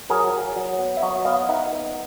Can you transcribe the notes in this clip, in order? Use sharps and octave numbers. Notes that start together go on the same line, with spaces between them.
F#3 G#4 A#4
F#3
F#3
B3
E5
F#3 C#5 D#5
B3 D#5 F5
D#4 E5 F#5
B3